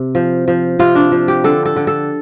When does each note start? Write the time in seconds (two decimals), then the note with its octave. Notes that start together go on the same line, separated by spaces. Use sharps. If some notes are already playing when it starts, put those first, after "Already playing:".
Already playing: C3
0.15 F3
0.48 F3
0.79 C3 F4
0.95 D4
1.12 F3
1.28 G4
1.44 D3 A4
1.65 A4
1.76 D3
1.87 A4